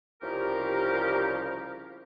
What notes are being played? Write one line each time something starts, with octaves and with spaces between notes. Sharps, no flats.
C2 C#3 F3 G4 A#4